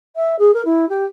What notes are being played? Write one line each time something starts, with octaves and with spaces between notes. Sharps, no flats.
E5
G#4
A#4
E4
G4